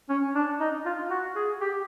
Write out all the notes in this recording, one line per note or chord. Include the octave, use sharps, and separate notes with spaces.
C#4
D4
D#4
F4
F#4
G#4
G4